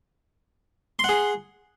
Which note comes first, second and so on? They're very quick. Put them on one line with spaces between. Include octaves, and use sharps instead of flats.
C6 F#5 G#4